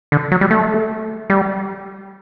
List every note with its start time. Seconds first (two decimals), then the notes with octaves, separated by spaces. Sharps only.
0.12 D3
0.32 F#3
0.41 G3
0.51 A3
1.30 G3